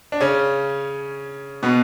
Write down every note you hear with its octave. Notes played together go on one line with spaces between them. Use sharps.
D4
C#3 C#4
B2 B3